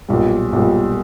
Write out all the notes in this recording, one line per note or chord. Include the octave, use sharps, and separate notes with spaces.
B1 A#2 G3
B1 A#2 G3